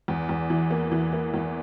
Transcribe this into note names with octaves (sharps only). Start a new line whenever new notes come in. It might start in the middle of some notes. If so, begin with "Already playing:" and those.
E2
E2
E3
A#3
E3
A#3
E2